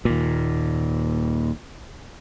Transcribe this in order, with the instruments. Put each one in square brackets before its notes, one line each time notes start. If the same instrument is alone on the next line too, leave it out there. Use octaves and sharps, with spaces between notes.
[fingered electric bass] D#2 A#2